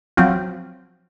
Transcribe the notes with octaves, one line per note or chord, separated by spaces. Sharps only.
F3 F#3 C4 F4